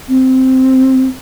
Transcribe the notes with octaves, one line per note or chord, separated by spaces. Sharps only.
C4